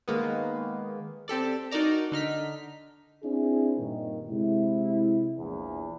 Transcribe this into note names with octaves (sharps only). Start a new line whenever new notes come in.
D#3 G#3 A#3 B3
C4 G4 A4 D5
D#4 F#4 A#4 D5 A#5
D3 D#4 F6 B6
C4 D4 E4 G#4
G2 A#2 D#3
C3 G#3 E4
A#1 E2